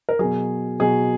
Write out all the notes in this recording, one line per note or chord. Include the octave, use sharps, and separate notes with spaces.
A#4
B2 F#3 G#4
B2 F#3 G#4